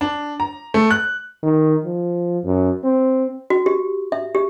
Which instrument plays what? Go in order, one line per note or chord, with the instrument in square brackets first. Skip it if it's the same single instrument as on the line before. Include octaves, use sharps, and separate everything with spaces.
[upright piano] D4
A#5
A3
F#6
[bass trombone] D#3
F3
F#2
C4
[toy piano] F#4
G4
E5
G4